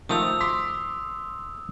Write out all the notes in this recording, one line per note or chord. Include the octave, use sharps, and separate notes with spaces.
D#3 F3 A3 D#6 E6 F7
C6 D6 B6